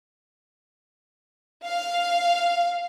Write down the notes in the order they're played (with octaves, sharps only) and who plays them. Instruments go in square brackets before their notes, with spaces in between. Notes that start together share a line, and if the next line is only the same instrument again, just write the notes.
[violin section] F5